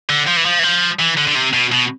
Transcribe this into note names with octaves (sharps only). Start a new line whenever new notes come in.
D3
F3
E3
F3
E3
F3
E3
D3
D3
C3
B2
B2